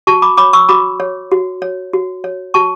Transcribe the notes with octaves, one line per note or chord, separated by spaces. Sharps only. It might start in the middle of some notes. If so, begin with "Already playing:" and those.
F#4 A5 C#6
B5 D6
C#5 B5 D6
C#6 E6
F#4 B5 D6
C#5
F#4
C#5
F#4
C#5
F#4 A5 C#6